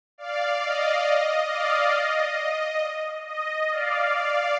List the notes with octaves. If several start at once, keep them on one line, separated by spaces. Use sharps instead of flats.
D5 F5
D#5
D#5
D5 F5
D#5
D#5
D5 F5
D5 F5